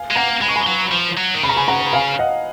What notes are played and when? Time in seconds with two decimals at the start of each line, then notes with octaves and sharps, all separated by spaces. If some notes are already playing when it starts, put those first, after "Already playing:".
Already playing: F5 G#5
0.11 G#3
0.15 A#3 F#5 A#5
0.41 G#3 B5
0.48 C#6
0.56 G#5 B5
0.67 F#3
0.92 F3
1.17 F#3
1.34 D#3
1.43 C#3 B5
1.49 A#5
1.57 G#5 B5
1.68 F#5 A#5
1.93 F5 G#5
2.19 D#5 F#5